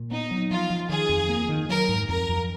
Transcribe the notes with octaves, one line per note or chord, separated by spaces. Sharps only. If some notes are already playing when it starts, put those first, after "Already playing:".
Already playing: A#2
B3 D#4
F#3
F3 F4
F3
D#3 G#4
F2
A#3
D#3
F#3 A#4
G#2
F2 A#4
F2